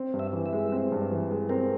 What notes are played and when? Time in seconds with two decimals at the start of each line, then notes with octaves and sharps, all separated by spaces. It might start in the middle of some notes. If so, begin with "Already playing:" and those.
Already playing: C4
0.13 G2
0.19 E5
0.33 E3
0.46 E5
0.53 G#3
0.72 C4
0.92 G2
1.12 E3
1.31 G#3
1.49 C4 A#4